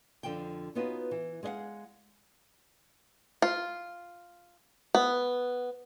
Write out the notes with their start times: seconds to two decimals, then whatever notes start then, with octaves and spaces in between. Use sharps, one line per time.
0.23 F2 D3 F3 G5
0.75 B3 C#4 D#4 F4 F#4 B4
1.11 E3
1.43 G#3 G#4 D#5 F5 F#5
3.42 F4
4.95 B3